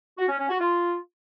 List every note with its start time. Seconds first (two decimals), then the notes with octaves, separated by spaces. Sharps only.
0.18 F#4
0.29 C#4
0.39 C#4
0.49 F#4
0.60 F4